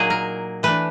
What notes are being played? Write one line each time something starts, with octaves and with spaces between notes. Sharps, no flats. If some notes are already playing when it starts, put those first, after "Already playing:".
Already playing: A#2 F#3 A#3 D#4 G#4
A#4
E3 A3 D4 B4